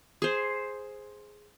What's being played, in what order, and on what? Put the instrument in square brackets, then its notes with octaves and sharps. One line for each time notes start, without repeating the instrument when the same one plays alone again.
[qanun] G#4 C5